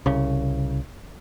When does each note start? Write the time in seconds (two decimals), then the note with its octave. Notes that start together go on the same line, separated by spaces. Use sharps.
0.06 C2 C#3